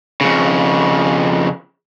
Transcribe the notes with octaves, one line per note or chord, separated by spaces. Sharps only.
F2 C#3